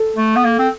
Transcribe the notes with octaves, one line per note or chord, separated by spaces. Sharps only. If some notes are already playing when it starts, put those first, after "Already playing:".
Already playing: A4
A3
B3
A#3
C4